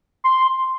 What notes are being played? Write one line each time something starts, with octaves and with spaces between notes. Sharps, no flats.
C6